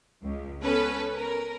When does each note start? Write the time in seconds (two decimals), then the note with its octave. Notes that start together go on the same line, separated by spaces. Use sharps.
0.22 C#2
0.61 B3 C#4 A4 B4
1.16 A#4